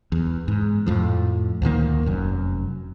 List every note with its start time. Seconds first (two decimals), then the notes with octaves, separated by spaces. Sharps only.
0.12 E2
0.48 G#2
0.86 F2 A2 F3
1.62 D2 A#2 D#3 A#3
2.06 F1 F#2